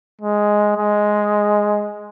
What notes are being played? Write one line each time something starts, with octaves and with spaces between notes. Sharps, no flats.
G#3
G#3